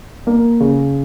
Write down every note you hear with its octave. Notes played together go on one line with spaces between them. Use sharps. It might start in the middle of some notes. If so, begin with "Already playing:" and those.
A#3
C#3